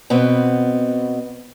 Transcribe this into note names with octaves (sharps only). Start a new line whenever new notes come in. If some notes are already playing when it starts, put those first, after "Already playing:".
B2 B3 C4